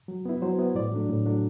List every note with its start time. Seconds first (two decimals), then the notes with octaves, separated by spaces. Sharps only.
0.08 F#3
0.26 B3 E4
0.42 F#3 C5
0.59 B3 E4
0.75 A2 D5
0.92 F#3 A3 D4
1.09 A2
1.26 F#3 A3 D4